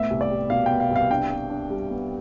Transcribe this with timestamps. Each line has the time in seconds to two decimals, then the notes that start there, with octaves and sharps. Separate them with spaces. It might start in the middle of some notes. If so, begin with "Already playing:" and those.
Already playing: A2 B3 E5
0.10 C2
0.21 D5
0.30 G3
0.50 B2 F5
0.66 B3 G5
0.80 F5
0.91 C2 F5
1.10 D4 G5
1.30 C3
1.50 D4
1.70 G3
1.90 B3